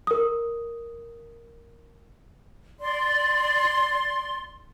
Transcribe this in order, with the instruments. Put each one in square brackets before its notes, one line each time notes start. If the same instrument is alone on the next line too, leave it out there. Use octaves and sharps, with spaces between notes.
[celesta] A#4 D#6
[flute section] D5 C6